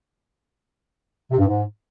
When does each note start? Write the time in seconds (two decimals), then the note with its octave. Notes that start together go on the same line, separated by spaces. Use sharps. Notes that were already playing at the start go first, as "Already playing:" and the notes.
1.31 C3
1.39 G2
1.46 G#2